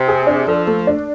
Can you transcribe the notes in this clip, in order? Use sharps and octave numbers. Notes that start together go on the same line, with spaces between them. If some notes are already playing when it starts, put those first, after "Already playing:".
Already playing: C3
G#4
D4
F3 A4
A3
D4